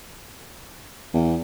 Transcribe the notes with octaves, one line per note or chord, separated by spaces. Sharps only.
E2